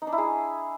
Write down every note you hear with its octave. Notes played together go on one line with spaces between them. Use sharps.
D#4
D4
E4
G#4